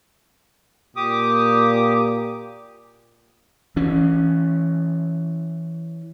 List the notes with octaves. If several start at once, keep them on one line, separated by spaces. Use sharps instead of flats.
A#2 G4 D6 D#6
E3 C#4